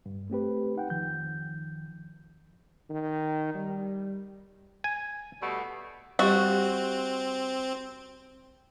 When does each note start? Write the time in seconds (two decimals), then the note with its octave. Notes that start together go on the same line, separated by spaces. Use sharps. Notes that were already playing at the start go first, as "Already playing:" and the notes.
0.06 G2
0.30 A3 C4 G4 B4
0.76 D#4 F#5 G5
0.90 F2 D#3 F3 G6
2.90 D#3
3.54 G3
4.84 G#5
5.42 B2 G3 A3
6.19 G3 C4 F#4 G4 D#5